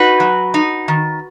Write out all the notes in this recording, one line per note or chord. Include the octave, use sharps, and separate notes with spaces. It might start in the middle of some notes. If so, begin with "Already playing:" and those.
Already playing: D#4 F#4 B4
F#3
D#4
D#3